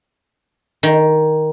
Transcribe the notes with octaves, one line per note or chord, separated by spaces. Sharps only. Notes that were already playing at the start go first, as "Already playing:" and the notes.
D#3